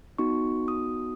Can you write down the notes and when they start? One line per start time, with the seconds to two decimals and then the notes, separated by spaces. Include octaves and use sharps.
0.18 B3 D#4 F#4 C#6
0.68 D#6